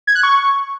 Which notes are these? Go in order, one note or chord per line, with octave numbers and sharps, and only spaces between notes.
G#6
F#6
C#6